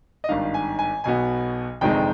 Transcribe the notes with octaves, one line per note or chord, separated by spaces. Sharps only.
D#5
G#1 G2 D#3 F5
G#5
G#5
B1 B2 B3 G#5
G1 F2 C3 D#3 G#3 G5